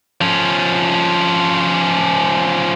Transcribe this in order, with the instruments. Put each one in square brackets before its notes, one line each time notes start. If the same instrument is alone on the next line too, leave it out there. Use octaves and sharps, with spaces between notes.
[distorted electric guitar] F3 C#4